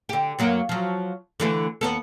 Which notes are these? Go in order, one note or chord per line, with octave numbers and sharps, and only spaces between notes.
D3 G4
F#2 F#3 A#3
F3 F#3
D3 E3 A3
D#2 B3 A4